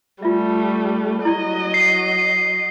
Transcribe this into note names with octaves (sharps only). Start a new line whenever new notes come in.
G3 A3 F4 E5
F#3 E4 D5 D#5
C7